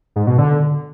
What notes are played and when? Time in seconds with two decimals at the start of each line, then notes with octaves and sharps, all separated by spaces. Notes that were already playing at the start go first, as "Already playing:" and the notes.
0.16 G#2
0.27 B2
0.38 D3